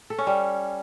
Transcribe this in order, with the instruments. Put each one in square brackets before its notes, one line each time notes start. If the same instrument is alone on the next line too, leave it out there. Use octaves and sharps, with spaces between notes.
[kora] A4
C#4
G3